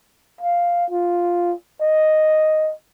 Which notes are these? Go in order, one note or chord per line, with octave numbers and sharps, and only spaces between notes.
F5
F4
D#5